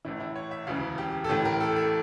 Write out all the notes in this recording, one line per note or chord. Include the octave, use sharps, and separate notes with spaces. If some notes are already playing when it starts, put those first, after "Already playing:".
A1 A2 E3 E4
E4
C#5
E5
E1 D2 C#3 E3 F5
G4
A4
A1 A2 E3 G4
A#4
A4
A4